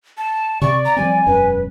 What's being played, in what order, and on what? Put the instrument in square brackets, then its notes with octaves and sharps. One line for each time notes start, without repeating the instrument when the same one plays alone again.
[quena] A5
[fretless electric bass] C3 [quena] D5 [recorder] C#6
[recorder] A#5
[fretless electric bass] F3 G3 C4 [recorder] G#5
[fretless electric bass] E1 F#2 C#4 [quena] B4